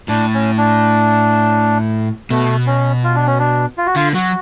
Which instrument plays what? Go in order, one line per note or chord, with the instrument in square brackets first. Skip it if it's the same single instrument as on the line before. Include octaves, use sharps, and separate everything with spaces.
[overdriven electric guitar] A2 [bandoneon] D4
[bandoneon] C#4
D4
[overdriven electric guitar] B2 [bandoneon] A3
[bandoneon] C#4
F4
D4
C#4
D4
F4
F#4
[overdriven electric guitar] D3 [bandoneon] F4
[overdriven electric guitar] F#3 [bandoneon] F#4